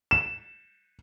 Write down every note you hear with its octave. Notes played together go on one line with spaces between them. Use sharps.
E7